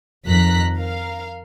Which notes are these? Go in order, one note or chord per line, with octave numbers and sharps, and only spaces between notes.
F2 D#3 F3 A#5 F#6 B6
A#4 F5